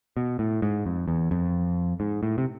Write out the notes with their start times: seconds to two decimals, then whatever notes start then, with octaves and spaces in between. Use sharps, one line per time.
0.17 B2
0.39 A2
0.62 G#2
0.86 F2
1.08 E2
1.31 F2
2.00 G#2
2.23 A2
2.38 C3